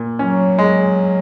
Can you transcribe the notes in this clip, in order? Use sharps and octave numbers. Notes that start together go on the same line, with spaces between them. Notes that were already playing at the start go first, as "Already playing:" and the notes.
Already playing: A#2
F#3 C#4
G#3